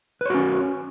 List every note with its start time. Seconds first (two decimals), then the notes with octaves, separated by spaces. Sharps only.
0.21 B4
0.25 C#5
0.30 F#4
0.34 C#4